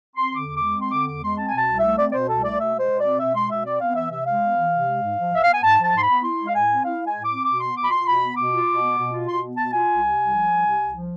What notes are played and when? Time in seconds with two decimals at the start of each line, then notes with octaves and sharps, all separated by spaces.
0.16 C4 C6
0.31 D3 D6
0.46 E2
0.56 G#3 D6
0.77 C4 C6
0.92 D3 D6
1.07 E2 D6
1.22 G#3 C6
1.37 C4 A5
1.48 G#5
1.53 B2 A5
1.68 C2
1.78 E5
1.84 A3
1.98 C4 D5
2.10 D5
2.13 B2 C5
2.28 C2 A4
2.43 A3 D5
2.59 B2 E5
2.75 G#3 C5
2.89 B2
3.00 C4 D5
3.19 B2 E5
3.35 G#3 C6
3.50 B2 E5
3.66 C4 D5
3.80 B3 F5
3.95 E3 E5
4.11 C3 E5
4.26 G#3 F5
4.42 B3
4.57 E3
4.72 C3
4.87 G#3
5.01 G#2
5.17 F3
5.33 G#2 E5
5.44 B3 F5
5.53 G#5
5.63 G#2 A5
5.78 F3
5.83 A5
5.94 G#2 C6
6.03 B5
6.08 B3
6.24 E4 C6
6.39 G#3
6.47 F5
6.54 A2 G#5
6.70 C4
6.84 E4 F5
7.00 G#3
7.05 G#5
7.15 A2
7.25 D6
7.30 C4
7.45 B2 D6
7.60 B3 C6
7.75 B2 D6
7.84 B5
7.90 F4 C6
8.06 B2 B5
8.21 B3
8.36 B2 D6
8.51 F4
8.67 B2
8.82 B3
8.98 B2
9.13 F4
9.27 B2 C6
9.43 B3
9.57 B2 A5
9.73 F4 G#5
9.89 C2
10.04 C3
10.18 C2
10.33 F3
10.49 C2
10.64 C3
10.80 C2
10.94 F3